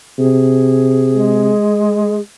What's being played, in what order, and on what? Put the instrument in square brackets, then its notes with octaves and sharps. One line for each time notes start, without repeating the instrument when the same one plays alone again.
[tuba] C3 [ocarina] G#4
[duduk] G#3